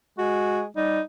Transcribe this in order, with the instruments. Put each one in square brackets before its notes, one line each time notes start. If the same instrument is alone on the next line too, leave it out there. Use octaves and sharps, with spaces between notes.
[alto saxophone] G#3 [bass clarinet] F#4
[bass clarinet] G3 [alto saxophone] D#4